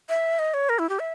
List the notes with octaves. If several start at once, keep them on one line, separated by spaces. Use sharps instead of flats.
E5
D#5
C#5
A#4
E4
G4
E5